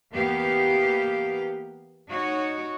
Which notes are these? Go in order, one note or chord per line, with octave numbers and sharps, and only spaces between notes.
E2 A#3 B3 G4 F5
D#4 F#4 C#5